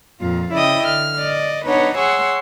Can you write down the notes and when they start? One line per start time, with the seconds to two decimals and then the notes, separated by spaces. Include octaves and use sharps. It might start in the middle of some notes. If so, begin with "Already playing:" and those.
0.21 F2 A#2 F4
0.53 C#3 E4 D5 D#5 G5 D#6
0.86 D3 F6
1.19 D5 D#5
1.65 B3 D4 D#4 B4 C#5 F#5
1.96 G#4 C#5 F#5 C6 C#6 E6